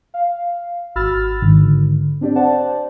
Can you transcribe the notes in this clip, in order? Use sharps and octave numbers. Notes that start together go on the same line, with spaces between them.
F5
G#1 F#4 B5 E6 F6 A6
G#2 D3 D#3
C4 D4 G4 D5
C5 D5 F#5 A5